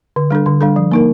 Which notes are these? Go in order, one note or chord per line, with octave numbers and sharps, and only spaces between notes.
D3
G3 D4 A4
D3
G3 D4 A4
F3
A#3 D#4 A#4